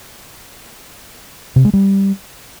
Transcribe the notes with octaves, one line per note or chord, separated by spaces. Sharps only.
C3
G#3
G3